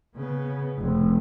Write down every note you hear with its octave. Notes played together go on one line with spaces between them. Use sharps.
C#3 B3
F1